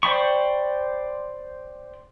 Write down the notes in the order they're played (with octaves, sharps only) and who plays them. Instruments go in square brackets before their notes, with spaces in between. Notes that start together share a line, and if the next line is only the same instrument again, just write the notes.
[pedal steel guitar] C5 D5 G5 B5 C#6